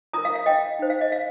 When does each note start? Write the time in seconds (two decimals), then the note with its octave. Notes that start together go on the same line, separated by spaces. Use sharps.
0.13 F4 A#4 A#5 D#6
0.25 F5
0.35 F5
0.46 D#5 G5
0.79 D#4 C5
0.90 F5
1.01 D#5
1.12 F5